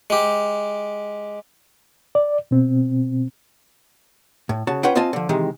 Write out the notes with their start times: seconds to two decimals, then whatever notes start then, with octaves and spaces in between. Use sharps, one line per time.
0.10 G#3 G4
2.15 D5
2.51 B2 C4
4.49 A2
4.67 C#3 F#4 A5
4.83 C#4 F4 B4 F#5 G5
4.95 C4 F4 D#5 G#5 A5
5.13 D3 F3
5.29 C3 D#3 E3 G#3